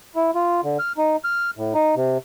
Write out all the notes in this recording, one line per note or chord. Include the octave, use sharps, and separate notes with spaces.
E4
F4
D3
F6
D#4
F6
A2
D#4
C3